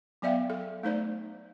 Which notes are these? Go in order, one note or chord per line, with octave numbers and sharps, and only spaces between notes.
F#3 B3 D5 E5 F5 G5
A4
A3 D#4 C5 D5